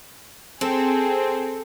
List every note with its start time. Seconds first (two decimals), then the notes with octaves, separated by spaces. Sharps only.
0.61 C4 G#4 A4